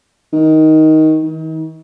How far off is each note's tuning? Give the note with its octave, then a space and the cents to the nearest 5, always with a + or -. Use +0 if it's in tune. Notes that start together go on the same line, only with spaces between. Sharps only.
D#3 +10
D#3 +40